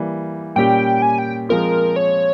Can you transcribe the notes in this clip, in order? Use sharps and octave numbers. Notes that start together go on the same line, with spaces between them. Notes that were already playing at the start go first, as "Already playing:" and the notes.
Already playing: E3 G3 A#3
A#2 G3 C#4 G4 G5
G#5
G5
F3 G#3 C4 F4 A#4
C#5